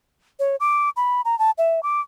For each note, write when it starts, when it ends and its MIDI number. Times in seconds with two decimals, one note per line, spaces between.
0.39 0.56 73
0.60 0.90 86
0.96 1.21 83
1.25 1.38 82
1.39 1.51 81
1.58 1.83 76
1.83 2.01 86